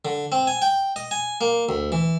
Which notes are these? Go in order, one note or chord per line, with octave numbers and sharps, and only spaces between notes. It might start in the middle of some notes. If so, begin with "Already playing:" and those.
D3
C4
G#5
G5
D#5
G#5
A#3
D2
E3